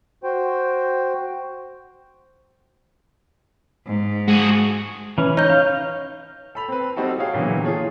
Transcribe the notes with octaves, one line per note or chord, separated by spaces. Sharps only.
F#4 C5 G5
G#2
G#3 F#4 G#4
E3 C#4
D#4 C#5 G6
F5
A4 B5 F7
C4 B4
G3 C4 D#4 F#4 A4
G#4 C#5 F5 G5
A#2 D3 E3 F#3 B3
F4 G#4 C#5 A5